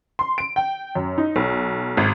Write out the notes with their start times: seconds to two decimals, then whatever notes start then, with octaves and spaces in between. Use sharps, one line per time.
0.19 C6
0.38 D7
0.56 G5
0.95 F#2
1.18 D#4
1.36 B1
1.97 G#1